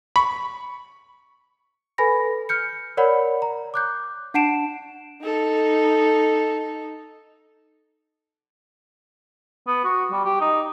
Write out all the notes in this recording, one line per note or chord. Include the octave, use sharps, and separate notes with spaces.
B5 C#6
A4 B4 G#5 B5 A#6
F6 G6 C#7
A#4 C#5 D5 F#5 B5
A#5
D6 F#6 G6
D4 F#5 A5 C7 D7 E7
D#4 A4
B3
F#4
G3
G4
D#4